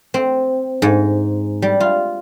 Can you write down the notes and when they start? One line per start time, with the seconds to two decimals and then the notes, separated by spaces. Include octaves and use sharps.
0.14 C4
0.82 G#2
1.62 G3
1.80 F4